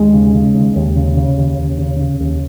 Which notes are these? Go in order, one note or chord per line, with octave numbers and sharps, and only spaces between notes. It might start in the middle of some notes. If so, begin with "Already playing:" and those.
Already playing: D#2 G#3
C#3
C#3
D#2
D#2
C#3
C#3
D#2
D#2
C#3
C#3
D#2